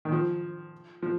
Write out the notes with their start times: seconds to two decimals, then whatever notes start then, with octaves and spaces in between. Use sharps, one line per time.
0.05 D#3
0.12 F3
1.02 F3